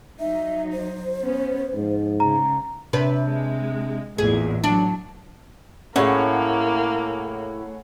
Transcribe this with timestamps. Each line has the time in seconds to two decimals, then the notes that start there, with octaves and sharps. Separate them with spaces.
0.19 F#3 D#4 E5
0.73 C5
1.20 B3 C#4
1.74 G#2 F3
2.20 C#3 A#5
2.93 C3 D4 B4
3.24 G#3
4.18 A1 E2 A#2 G#4
4.64 F#3 D4
5.96 A2 A#3 C#4 G#4 C#5 F#5